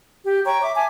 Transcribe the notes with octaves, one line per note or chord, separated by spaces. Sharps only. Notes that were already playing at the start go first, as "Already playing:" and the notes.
G4
C#5 G5 A#5 C#6
E5 D6
E5 G#5 A5 D6